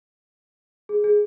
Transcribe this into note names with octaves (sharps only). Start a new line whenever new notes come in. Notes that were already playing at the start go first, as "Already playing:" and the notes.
G#4
G#4